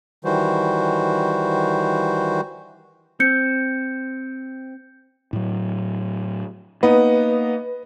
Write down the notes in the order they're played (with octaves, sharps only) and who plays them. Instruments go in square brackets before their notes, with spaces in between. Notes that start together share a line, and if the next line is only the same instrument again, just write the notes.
[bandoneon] D#3 E3 G3 F#4 C5
[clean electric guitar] C4 [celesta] G6 C#7
[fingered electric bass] A2 F#3
[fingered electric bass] A#3 [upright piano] B3 D#4 [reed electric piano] B4